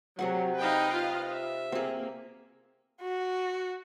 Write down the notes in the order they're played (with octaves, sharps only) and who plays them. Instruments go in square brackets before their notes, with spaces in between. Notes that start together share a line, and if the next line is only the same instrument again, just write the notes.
[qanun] C3 G#4 F#5 [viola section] F#3
[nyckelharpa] D#4 G5 [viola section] B4 D#5 F5
[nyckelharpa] F4
E5
[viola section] A#3 [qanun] C4 G#4
[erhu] F#4